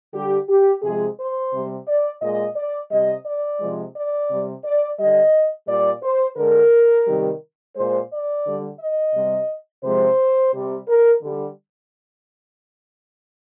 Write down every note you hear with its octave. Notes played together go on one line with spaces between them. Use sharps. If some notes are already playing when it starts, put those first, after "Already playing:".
D3 G3 G4
G4
C3 F3 G#3 G#4
C5
C3 G3
D5
A#2 G#3 D#5
D5
C3 G3 D#5
D5
C3 F3 G#3
D5
C3 G3
D5
D3 G3 D#5
A#2 G3 D5
C5
D3 G#3 A#4
C3 D#3 G3
A#2 G#3 C5
D5
D3 G3
D#5
C3 G3
C3 F3 G#3 C5
C3 G3
A#4
D3 G3